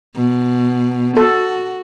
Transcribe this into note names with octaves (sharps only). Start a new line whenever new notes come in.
B2
F#4 A4